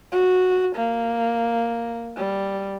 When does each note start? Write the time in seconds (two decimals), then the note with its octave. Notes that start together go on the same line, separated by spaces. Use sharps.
0.12 F#4
0.76 A#3
2.17 G3